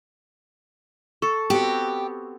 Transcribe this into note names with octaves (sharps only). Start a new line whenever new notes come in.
A4 C#6
B3 C4 F#4 G4